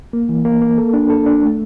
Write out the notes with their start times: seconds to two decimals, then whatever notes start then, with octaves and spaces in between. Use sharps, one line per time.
0.13 A#3
0.29 E3
0.45 A#3
0.62 A#3
0.78 A4
0.93 D4
1.10 A4
1.26 D4
1.43 A3